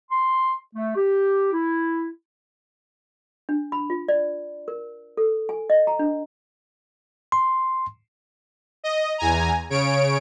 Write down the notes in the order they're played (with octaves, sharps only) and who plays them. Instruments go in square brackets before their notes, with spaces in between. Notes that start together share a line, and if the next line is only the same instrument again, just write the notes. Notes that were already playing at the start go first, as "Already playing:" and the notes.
[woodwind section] C6
A3
G4
E4
[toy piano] D4
B5
F4
D5
A#4
A4
G#5
D#5
A#5
D4
[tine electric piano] C6
[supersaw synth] D#5
E2 G#5 A#5
C#3 C#5 D7